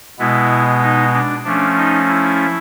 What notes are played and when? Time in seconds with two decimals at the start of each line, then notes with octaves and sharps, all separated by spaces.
0.19 B2 G#3 B3 E4
0.82 D#4
1.14 D4
1.45 F3 A3 C#4 D4
1.77 D#4
2.09 E4